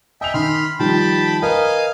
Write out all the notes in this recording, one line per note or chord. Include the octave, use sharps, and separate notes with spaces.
D#5 E5 G5 G#5 F7
D#3 B5 C6 F6
D#3 F3 G3 G5 A5 B5
A#4 B4 D#5 F5 G#5